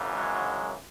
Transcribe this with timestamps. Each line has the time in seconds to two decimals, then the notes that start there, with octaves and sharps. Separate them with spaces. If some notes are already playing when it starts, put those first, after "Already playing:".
Already playing: G#1 F#2 C#3 E3
0.15 F#3 G#3